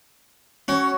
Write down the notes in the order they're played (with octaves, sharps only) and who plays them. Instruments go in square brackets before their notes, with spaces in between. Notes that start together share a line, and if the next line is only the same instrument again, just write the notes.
[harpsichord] C#4 [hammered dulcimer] F#4 C#5